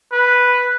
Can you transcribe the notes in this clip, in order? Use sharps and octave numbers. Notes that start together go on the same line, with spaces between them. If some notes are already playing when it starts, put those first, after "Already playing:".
B4